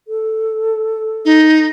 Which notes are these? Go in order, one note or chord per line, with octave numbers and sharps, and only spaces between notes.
A4
D#4